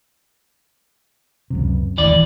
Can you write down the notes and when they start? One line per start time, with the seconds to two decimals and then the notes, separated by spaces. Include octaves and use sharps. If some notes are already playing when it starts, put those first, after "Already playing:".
1.50 C#2 F#2 C3
1.98 D#1 G#1 D2 E3 D5